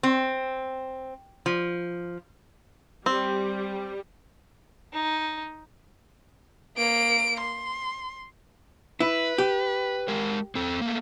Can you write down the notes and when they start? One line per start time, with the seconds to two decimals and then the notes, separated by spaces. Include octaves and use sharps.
0.03 C4
1.46 F3
3.06 G3 C4
4.93 D#4
6.77 A#3 D7
7.40 C6
9.00 E4 B4
9.38 G4
10.08 G#3 A#4
10.55 C4 A4
10.81 A3 A#3